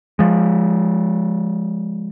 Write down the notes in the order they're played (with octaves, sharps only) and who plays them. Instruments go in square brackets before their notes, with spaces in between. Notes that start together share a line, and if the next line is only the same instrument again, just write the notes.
[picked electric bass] F3 G#3